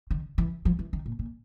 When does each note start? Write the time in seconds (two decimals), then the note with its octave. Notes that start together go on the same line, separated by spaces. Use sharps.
0.11 D#3
0.38 E3
0.65 F3
0.79 E3
0.93 D#3
1.06 A#2
1.19 A#2